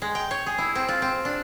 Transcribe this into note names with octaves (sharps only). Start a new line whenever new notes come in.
G#3
G5
C#5
G#4
E4
C4
F4
C4
D4